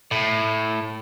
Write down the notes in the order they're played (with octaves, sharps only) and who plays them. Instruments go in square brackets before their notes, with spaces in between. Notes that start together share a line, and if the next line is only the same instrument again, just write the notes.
[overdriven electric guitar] A2